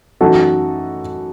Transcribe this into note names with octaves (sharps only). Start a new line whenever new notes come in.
F#2 E3 A3 D#4 F#4 A4